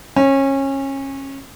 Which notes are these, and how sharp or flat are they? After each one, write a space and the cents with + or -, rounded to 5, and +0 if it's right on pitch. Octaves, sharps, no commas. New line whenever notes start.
C#4 -25